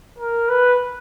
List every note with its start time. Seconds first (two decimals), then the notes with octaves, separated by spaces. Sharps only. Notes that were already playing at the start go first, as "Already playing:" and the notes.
0.19 A#4
0.49 B4